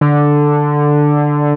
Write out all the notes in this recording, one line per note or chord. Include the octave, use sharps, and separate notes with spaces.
D3